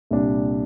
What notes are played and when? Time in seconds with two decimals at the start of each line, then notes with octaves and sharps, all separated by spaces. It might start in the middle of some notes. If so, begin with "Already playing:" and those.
0.11 C2 A#2 G3 D4